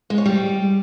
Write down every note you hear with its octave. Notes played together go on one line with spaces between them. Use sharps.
G#3
C#5
G3